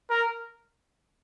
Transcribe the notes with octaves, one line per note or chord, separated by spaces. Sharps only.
A#4